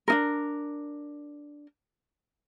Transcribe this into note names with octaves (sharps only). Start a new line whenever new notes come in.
D4 D#4 A#4